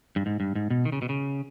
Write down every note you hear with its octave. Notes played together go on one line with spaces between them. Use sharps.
G2
G#2
G2
G#2
B2
D#3
C#3
B2
C#3